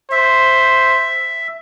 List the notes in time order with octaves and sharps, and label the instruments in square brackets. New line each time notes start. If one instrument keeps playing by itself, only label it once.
[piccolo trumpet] C5 [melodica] E5